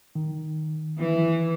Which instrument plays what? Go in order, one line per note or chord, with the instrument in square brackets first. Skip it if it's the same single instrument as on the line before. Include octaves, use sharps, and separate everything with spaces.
[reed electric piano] D#3
[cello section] E3